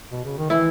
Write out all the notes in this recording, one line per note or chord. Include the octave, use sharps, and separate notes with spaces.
B2
C#3
D#3
E3 E4